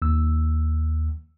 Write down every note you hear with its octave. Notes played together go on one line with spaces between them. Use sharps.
D#2 E6